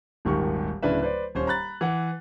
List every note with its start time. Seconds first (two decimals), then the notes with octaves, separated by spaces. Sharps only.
0.25 D#1 G#1 D#3 G4 C#6
0.83 D1 C#3 D4 E4 B4 E5
1.02 B4 C5 D5
1.35 D#1 C#4 C5
1.47 A#5 B5 F#6 A6
1.81 E3 F#5